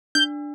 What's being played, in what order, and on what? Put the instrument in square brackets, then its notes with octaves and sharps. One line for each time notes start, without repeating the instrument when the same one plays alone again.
[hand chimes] D4 [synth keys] G6